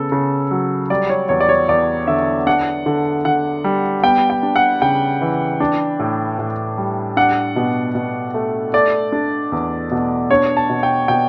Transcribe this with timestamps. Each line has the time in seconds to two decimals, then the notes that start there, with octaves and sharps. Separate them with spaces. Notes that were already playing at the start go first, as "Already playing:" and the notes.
Already playing: C#3 B3 A4
0.12 C#3
0.51 F#3
0.90 G3 D5
1.10 C#5
1.29 E2 C#5
1.40 D5
1.49 C#5
1.69 E2 D5
2.07 D3 E5
2.47 D4 F#5
2.86 D3
3.25 D3 F#5
3.64 G3
4.03 B3 G5
4.30 G5
4.43 D4
4.56 F#5
4.82 C#3 G5
5.21 E3
5.60 D4
5.99 A2
6.39 A2
6.78 G3
7.17 D4 F#5
7.56 B2
7.95 B2
8.34 A3
8.73 A3 D5
9.12 D4
9.52 E2
9.91 B2
10.31 D4 C#5
10.57 A5
10.69 B2
10.83 G5
11.08 B2 G5